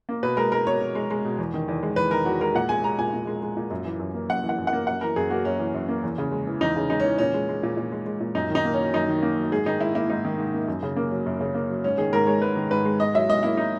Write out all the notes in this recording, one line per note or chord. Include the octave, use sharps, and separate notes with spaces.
A#3
B2 B4
G#3 A#4
G#3 A#4
B2 C#5
B2
G#3
G#3
B2
E2
D#3
E2
G#3
E2 B4
D#3 A#4
E2 F#4
G#3 A#4
A#2 F#5
G#3 G#5
G#3 A#5
A#2 G#5
A#2
G#3
G#3
A#2
F#2
E3
F#2
A#3
F#2 F#5
E3
F#5
F#2
F#5
A#3
F#2 F#5
E3 A#4
F#2 G#4
A#3 F#4
F#2 C#4
E3
F#2
A#3
E2
C#3
G#3
E3
E2 D#4
C#3
G#3 D#4
C#4
E3
A#2 C#4
G#3
G#3
A#2
A#2
G#3
G#3
A#2
F#2 D#4
D#3 D#4
A#3
C#4
F#3
F#2 D#4
D#3
A#3
F#3
G#2 G#4
D#3 D#4
G#2 E4
A#3 E4
G#2 D#4
D#3
G#2
A#3
F#2
C#3
A#3
F#3
F#2
C#3
A#3
F#3
G#2 C#4
D#3 G#4
G#2 A#4
G#3 C#5
G#2 B4
D#3
G#2 B4
G#3
G#2 D#5
F#3 E5
G#2 D#5
A#3 E4
D#4